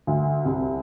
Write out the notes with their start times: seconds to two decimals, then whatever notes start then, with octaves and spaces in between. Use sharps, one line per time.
0.07 D2
0.45 C2